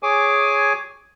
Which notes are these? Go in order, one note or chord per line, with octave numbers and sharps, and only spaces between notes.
G#4 C#5 G#5 D6